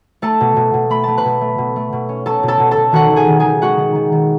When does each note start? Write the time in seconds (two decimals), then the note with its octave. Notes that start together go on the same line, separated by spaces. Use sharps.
0.22 A3 A4 A5
0.40 B2
0.56 B2
0.74 B2
0.90 A3 B5
1.04 A3 A5
1.18 B4 B5
1.25 B2
1.41 A3
1.58 B2
1.76 A3
1.92 B2
2.09 C#4
2.26 C#4 A4 A5
2.43 B2
2.48 A4 A5
2.60 B2
2.71 A4 A5
2.77 B2
2.92 D#3 F#4 F#5
3.11 D#3
3.16 G#4 G#5
3.28 D#3
3.40 G#4 G#5
3.45 D#3
3.61 G#3 F#4 F#5
3.79 D#3
3.95 D#3
4.12 D#3